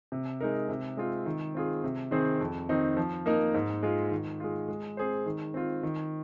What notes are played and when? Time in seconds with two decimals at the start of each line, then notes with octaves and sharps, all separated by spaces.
0.12 C3
0.41 G#3 D#4 A#4
0.69 C3
0.97 G#3 C4 F4
1.26 D#3
1.55 C4 F4 G#4
1.84 C3
2.11 D#3 C4 G#4 C5
2.40 F2
2.69 D#3 C4 D#4
2.97 F3
3.26 A#3 D#4 A#4
3.54 G#2
3.83 G#3 F4
4.11 D#3
4.40 G#3 F4
4.68 G#3
4.97 C4 G#4 C5
5.26 D#3
5.54 C4 F4
5.83 D#3